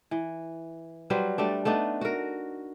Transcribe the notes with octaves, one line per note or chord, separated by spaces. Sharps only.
E3
F#3 G3 B4 C5
G3 A3 D4
A3 B3 D4 D#4
F#4 A#4